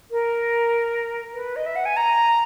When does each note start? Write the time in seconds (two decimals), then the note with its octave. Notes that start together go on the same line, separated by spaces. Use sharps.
0.11 A#4
1.34 B4
1.56 D#5
1.66 E5
1.76 F#5
1.86 G#5
1.97 A#5